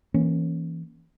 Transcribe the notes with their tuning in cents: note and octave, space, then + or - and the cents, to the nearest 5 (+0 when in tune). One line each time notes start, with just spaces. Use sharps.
E3 +0 A#3 +0 C#4 -15